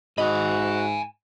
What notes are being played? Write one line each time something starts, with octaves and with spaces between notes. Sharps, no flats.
G#2 F#4 D#5 G#5 B5